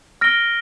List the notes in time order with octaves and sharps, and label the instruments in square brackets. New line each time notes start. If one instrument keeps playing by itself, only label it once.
[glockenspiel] F6 A#6 D7 G7